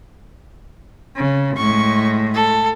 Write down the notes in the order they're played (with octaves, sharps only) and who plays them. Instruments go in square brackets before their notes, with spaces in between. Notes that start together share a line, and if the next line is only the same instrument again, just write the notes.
[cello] C#3
[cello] A2 G#3 [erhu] C#6
[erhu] A4